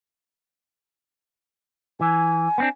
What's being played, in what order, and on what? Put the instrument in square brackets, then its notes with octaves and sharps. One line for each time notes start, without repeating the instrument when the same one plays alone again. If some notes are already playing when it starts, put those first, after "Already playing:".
[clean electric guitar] E3 [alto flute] G#5
[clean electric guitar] B3 C4 D4